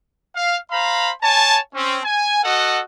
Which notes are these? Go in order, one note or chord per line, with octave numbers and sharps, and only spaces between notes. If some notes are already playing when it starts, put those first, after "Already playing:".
F5
C5 F5 A#5 B5
C#5 G#5 A5
C4 C#4
G#5
F#4 A4 D#5 F#5